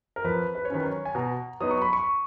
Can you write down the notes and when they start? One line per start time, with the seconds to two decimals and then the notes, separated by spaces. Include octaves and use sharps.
0.16 A#4
0.24 F2 B4
0.55 B4
0.65 C#5
0.70 D#3 F#3 C#4 B4
0.85 C#5
1.05 G#5
1.15 B2 A#5
1.61 F#3 B3 D#4 D#6
1.71 C#6
1.82 B5
1.93 C#6